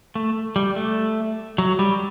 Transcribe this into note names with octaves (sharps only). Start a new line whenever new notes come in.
A3
G3
A3
F#3
G3